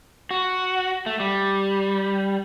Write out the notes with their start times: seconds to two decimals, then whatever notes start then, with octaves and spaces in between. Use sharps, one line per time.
0.31 F#4
1.06 A3
1.20 G3